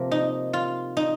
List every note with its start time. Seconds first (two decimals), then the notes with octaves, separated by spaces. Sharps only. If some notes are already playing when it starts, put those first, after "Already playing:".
Already playing: C3 F3 A#3 A#4
0.11 D#4
0.53 F4
0.97 D#4